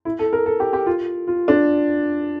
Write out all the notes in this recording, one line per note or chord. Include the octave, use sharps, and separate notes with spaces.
E4
A4
A#4
A4
G4
G4
F4
F4
D4